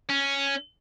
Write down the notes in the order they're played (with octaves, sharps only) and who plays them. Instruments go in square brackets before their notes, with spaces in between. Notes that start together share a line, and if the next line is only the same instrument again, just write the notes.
[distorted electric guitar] C#4